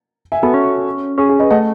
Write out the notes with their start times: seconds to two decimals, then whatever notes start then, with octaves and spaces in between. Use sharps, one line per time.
0.32 E5 G#5
0.43 B3 F#4 A4
0.54 C#4
1.18 C#4 G#4
1.29 G#4
1.39 B4 D#5
1.50 A3 D#5 F#5